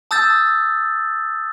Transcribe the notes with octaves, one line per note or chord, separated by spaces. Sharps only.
A5 D#6 E6 G6 A6